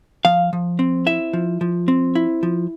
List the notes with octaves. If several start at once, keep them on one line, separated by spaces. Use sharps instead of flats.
F3 F5
F3
C4
E4 E5
F3
F3
C4
E4
F3